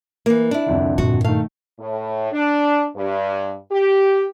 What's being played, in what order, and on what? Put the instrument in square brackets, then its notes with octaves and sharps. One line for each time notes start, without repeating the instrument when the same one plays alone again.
[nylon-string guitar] E3 A#3
D4 E4
[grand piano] C2 F2 D3
[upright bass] G2 A#2 [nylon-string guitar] F#4
[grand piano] D#3 A3 [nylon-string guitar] F5
[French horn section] A2
D4
G2
G4